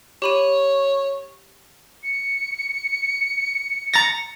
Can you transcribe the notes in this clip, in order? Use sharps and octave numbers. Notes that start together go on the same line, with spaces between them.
G4 C#5 B5 D#7
C#7
A#5 A6 A#6